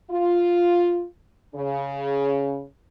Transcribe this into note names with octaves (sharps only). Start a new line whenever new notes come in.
F4
C#3